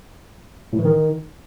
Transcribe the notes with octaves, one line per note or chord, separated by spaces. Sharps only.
A2
E3
D#3